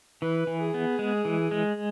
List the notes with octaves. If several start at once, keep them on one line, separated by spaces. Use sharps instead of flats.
E3 B4
E3
G#4
B3
G#3
E3
G#3